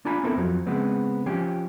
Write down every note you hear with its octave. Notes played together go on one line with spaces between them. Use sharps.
D4 F4 G#5 A#5 B5
B3 C4 E4 A4 A#4
F2 F3 F#3
C#3 G#3 B3 C4
F3 C#4 G4